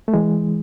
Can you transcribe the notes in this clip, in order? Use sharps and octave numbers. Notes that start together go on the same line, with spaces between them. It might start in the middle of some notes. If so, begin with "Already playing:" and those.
A3
E3 G#3